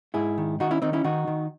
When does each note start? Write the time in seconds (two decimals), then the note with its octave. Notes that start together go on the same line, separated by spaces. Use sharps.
0.14 G#2 E4 G#4
0.38 D#3
0.60 D#3 D#4 F#4
0.71 C#4 E4
0.82 D#3 C4 D#4
0.93 C#4 E4
1.04 D#3 D#4 F#4
1.27 D#3